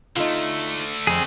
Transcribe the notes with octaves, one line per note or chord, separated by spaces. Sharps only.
D3 A3 D#4 F4
F2 C4 G#4